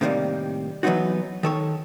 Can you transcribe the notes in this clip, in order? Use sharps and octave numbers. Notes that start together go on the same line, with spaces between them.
A2 C3 D#3 E3 G3 A#3
E3 F#3 A#3 B3 D#4 F#4
D#3 A4 C#5